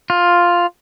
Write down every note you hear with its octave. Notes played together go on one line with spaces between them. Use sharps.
F4